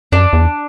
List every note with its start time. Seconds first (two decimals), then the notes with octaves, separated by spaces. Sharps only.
0.12 F#2 D4
0.33 E2